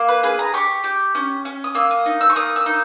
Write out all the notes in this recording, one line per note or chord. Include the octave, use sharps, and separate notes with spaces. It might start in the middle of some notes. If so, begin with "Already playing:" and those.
Already playing: A#3
B4
G#4 B4
A#5
G4 C#6
G4
C#4
C#4
D#6
A#3 E6
D#6
D#4
E6
C#6
A#3 D#6
E6
D#4